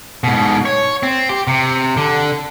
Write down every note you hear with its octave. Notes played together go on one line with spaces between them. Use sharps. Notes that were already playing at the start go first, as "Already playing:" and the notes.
G#2 B2
C#5
C4
G4
C3
D3